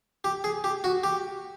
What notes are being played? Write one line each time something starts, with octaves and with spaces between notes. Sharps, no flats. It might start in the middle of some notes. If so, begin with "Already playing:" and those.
G4
G#4
G4
F#4
G4